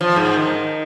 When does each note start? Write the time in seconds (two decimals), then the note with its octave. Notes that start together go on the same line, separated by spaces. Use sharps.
0.01 F3
0.16 G#2
0.36 D#3